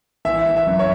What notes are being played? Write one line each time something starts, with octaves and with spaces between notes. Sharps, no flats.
E3 E5
E3
E5
F#2
C#5